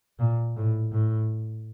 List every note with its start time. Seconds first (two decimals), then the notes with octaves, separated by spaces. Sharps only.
0.19 A#2
0.57 A2
0.92 A2